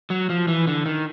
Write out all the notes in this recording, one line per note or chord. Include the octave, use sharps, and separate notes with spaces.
F#3
F3
E3
D3
D#3